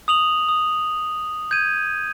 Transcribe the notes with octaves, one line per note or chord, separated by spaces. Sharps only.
D#6 F7 F#7
D#6
G6 G#6 D#7